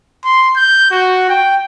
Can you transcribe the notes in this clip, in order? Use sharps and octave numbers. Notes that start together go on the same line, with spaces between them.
C6
G6
F#4
G5